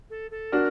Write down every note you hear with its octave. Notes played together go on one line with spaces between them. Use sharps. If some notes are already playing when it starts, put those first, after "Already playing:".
A4
A4
D4 F#4 A#4